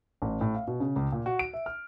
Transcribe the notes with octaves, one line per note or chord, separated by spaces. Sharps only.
A1
A2
F5
B2
C#3
C#2
A#2
F#4
D7
E5
F6